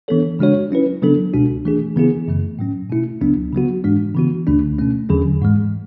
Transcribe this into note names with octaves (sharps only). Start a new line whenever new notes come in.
E3 B3 D4 A4 C#5
C#3 G#3 D4 F#4 C#5
F#3 C#4 E4 B4
C#3 F#3 B3 D4 A4
C#2 B2 G#3 D4 F#4
E3 A3 D4 G#4
C#3 E3 B3 E4 G#4
F#2 C#3 E3 A3
A2 F#3 C#4
B2 A3 E4
C#2 C#3 F#3 B3 D4
C#3 F#3 B3 F#4
G#2 E3 G#3 D4
C#3 E3 B3 F#4
D2 D3 A3 D4
B2 A3 C#4
E2 D3 F#3 C#4 G#4
G#2 E3 G#3